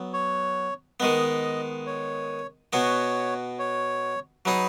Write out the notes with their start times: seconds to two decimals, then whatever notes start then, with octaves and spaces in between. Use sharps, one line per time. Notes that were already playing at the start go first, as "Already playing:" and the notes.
Already playing: F#3 B3
0.13 C#5
1.00 D#3 G#3 B3 D#5
1.86 C#5
2.73 B2 B3 F#4 C#5
3.59 C#5
4.45 F#3 D#4 G#4 B4